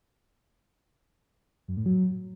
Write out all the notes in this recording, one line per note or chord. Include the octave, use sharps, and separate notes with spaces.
F#2
A2
F#3